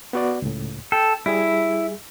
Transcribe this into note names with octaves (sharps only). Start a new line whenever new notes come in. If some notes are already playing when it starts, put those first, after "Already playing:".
B3 F#4 D5
C#2 A2
A4 G5
G3 E4 G#4